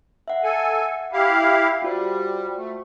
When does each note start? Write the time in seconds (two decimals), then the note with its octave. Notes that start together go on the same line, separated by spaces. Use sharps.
0.28 E5 F#5
0.44 A4 G#5
1.13 E4 G4 F5
1.44 E5
1.82 G3 F4 F#4 C5
2.57 A3